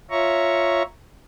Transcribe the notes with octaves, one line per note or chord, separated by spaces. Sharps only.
F4 C#5 E5 A#5 C#6